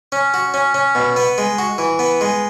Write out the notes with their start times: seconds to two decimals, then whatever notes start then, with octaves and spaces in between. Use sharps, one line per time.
0.12 C#4
0.34 F#4
0.54 C#4
0.74 C#4
0.95 B2
1.16 B3
1.38 G#3
1.58 F#4
1.78 E3
1.99 B3
2.21 G#3